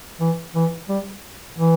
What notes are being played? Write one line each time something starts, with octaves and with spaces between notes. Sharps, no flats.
E3
E3
G3
E3